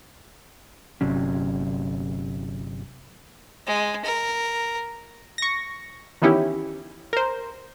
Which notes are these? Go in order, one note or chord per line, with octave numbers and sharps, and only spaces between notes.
G1 C3 F#3 C#4
G#3
A#4
C#6 A#6
D#3 E3 B3 C#4 E4 G4
A#4 C5